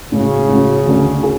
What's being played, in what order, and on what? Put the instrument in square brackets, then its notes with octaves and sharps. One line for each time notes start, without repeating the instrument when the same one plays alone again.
[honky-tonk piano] A2 G#3 C#4 F#4 [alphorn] C#3
[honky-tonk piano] A2 G#3 C#4 F#4
D2 D3 A3 D4 G#4
G#4